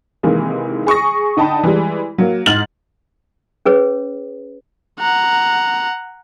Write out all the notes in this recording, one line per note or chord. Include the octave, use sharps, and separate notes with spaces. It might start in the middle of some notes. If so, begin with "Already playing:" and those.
C3 D#3 E3 G#3 A#3
G#4 C#6 D#6 A#6
D3 D#4 G5 A5 B5
E3 G3 G#3
F#3 A#3
G#2 F6 A6 F#7
C#4 G#4 B4 C#5
F#5 A#5